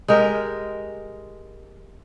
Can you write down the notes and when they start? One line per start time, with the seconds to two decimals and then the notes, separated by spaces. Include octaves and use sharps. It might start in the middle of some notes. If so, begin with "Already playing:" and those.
0.08 G#3 G4 A#4